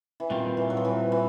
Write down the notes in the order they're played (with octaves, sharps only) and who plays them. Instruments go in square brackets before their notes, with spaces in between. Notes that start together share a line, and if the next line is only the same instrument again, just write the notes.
[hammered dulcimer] E3
[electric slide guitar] A#2 G3 C4 F4 [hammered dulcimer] D#3
[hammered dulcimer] E3
F#3
F3
E3
E3